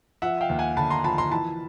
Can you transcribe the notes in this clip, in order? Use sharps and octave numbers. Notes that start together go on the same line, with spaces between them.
F3 E5 F#5
F5 G5
D#2
F#5 G#5
D3 A5 B5
A#5 C6
F3 A5 B5
A#5 C6
E3 A5 B5